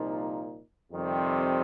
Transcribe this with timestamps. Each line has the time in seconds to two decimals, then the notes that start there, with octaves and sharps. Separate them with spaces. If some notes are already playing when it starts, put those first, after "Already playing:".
Already playing: C2 A#2 F3 A#3 D#4
0.92 F2 C3 D#3 G3 C4